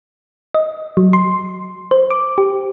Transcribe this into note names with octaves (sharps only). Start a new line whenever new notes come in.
D#5
F#3
C6
C5
D6
G4